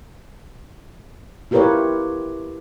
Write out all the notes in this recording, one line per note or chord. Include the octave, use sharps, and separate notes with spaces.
E4 F4 G4 A#4 B4 C#5